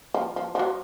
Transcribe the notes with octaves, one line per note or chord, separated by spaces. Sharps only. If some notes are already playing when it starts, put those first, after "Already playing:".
F3
F3
F3
F#3